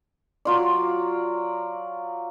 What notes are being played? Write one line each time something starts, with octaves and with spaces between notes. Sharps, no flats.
F#3 F4 D5